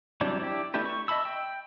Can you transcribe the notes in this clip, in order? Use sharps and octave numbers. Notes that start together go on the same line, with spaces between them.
F#3 G3 C4 D4 E4
D4 E4 G4
A3 D4 E4 G4 B4
C#6
D#5 E5 A5 B5 E6
G5